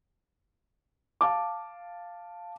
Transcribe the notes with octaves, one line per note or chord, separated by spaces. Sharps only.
F5 A5 D6